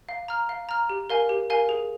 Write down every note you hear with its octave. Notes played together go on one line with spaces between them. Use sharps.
F5
A#5 F6
F5
A#5 F6
G4
A#4 F5 G#5
G4
A#4 F5 G#5
G#4